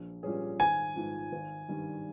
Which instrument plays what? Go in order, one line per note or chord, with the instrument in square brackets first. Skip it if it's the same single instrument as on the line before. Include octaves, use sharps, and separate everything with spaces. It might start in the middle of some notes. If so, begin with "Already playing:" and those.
Already playing: [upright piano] A#1
A#2 G3 C#4 G#4
[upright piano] G#1 [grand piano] G#5
[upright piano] G#2 F3
G#1
G2 D#3 G3